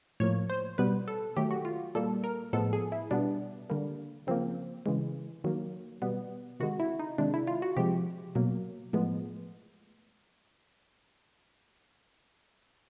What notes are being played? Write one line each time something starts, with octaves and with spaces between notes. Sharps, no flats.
A2 F3 A#3 C#5
C5
B2 G3 B3 B4
A4
D#3 F#3 A3 G4
F#4
F4
A#2 G3 A#3 A4
A#4
A2 F3 G#3 B3 A4
G#4
E4
B2 G3 B3 D4
D3 G3 A#3
C#3 F3 A#3 C4
C#3 E3 G#3
D#3 F#3 A#3
B2 G3 B3
C3 D#3 G#3 F#4
E4
D#4
C3 D#3 G#3 D4
E4
F4
F#4
C3 F3 G#3 G4
B2 F#3 A#3
A2 F3 G#3 B3